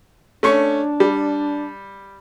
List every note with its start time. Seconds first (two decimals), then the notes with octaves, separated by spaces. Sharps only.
0.43 A3 C#4 D4 C#6
1.00 G3